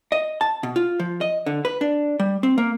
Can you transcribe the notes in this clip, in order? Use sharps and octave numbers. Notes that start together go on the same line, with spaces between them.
D#5
A5
B2
F4
F3
D#5
D3
B4
D4
G3
C4
A#3